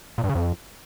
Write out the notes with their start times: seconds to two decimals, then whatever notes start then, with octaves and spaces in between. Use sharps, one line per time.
0.18 A#2
0.24 G2
0.29 C#3
0.35 F2